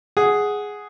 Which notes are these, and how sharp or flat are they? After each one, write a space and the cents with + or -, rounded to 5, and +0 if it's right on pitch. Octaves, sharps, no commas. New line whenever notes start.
G#4 +0 F#5 +0